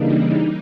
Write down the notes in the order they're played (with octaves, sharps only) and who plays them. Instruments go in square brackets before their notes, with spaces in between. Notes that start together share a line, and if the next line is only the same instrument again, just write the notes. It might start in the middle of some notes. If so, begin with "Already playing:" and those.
Already playing: [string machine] C#3 E3 G3 A#3 D4 D#4